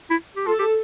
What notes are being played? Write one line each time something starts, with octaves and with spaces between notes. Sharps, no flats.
E4
G4
F4 A4
G4